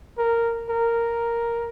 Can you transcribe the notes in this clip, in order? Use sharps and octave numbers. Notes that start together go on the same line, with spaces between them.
A#4
A#4